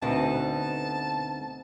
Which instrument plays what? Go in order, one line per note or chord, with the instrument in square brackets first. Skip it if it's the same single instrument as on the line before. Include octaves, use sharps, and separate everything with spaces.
[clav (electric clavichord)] D2 [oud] B2 [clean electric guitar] C4 D#4 [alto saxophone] A5